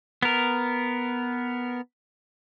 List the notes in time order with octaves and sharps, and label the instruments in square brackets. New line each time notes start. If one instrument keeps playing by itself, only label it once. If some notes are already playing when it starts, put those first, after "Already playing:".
[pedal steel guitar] B3 A#4